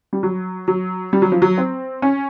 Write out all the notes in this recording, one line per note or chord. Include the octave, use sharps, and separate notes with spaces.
G3
F#3
F#3
G3
F#3
F3
F#3
C4
C#4